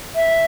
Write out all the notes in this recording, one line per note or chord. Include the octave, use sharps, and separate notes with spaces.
E5